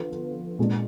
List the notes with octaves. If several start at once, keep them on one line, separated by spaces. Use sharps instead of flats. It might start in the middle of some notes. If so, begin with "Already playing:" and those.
Already playing: D3 F3 B3 F4 B4
A#2 G#3 D4